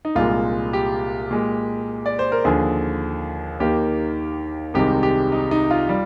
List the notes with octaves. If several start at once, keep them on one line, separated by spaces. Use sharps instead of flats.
D#4
C2 A#2 G#3 F4
G4
A#2 G#3
D5
C5
A#4
D#2 D3 F3 G#4
D#2 D#3 A#3 G4
C2 C3 D#3 G#3 G4
G4
D#4
D#4
F4
G3